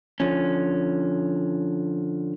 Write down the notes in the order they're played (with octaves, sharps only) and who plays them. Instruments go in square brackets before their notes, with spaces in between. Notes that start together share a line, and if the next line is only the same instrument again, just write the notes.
[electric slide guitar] D3 F3 C#4